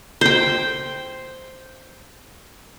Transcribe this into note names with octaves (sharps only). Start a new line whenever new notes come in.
C5 G5